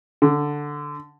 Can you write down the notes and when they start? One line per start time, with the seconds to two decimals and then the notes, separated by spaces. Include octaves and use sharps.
0.22 D3